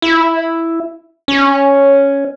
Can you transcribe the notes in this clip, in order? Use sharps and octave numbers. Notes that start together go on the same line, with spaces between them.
E4
C#4